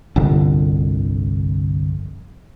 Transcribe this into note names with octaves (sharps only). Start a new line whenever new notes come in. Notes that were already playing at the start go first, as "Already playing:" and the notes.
G1 C2 F2 D3